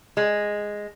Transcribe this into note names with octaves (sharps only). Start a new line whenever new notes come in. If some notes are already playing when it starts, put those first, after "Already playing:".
G#3